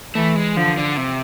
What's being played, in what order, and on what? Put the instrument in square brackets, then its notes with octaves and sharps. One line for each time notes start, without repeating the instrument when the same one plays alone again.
[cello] E3 [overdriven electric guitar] A3
[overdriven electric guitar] G#3
[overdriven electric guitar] D3 [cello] F3
[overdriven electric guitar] D3
C3